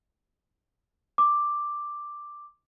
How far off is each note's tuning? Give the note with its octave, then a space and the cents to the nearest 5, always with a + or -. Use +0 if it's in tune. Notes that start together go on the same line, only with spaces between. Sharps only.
D6 +5